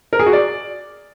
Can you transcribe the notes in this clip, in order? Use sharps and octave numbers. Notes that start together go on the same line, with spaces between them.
A#4
G#4
F#4
D5